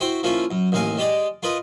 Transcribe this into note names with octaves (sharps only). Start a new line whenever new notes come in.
E4 F#4 C5 G5
F3 A#3 C#4 E4 F4
F#2
A1 D#2 A#4 F5 G#5
G#3 G4 D5 D#5
F4 A#4 B4 D#5